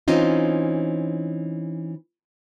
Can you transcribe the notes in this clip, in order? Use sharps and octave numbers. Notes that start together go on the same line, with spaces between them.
E3 C4 C#4 D#4 F4